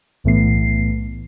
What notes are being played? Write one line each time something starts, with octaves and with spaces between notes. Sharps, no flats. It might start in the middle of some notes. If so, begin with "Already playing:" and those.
B1 A2 E3 A3 B3 C7